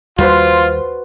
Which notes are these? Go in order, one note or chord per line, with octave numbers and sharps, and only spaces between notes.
D#2 G3 F4 F#4 B4 C5